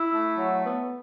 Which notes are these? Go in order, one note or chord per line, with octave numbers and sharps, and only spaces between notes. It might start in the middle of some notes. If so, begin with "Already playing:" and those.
Already playing: E4
A3
F#3
B3